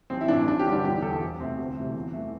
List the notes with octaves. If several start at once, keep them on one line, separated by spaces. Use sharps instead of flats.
A1 C4
E4
A2 E3 A3 D4
A1 D4
G4
G2 D3 G3
D4
E1 G4
E2 D3 A4
D2
C3 A3 C4
D2
C3 E3 A3
E2
E3 A3